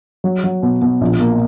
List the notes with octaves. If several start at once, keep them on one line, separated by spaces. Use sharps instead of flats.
F#3
F#3
B2
B2
A#1
A#3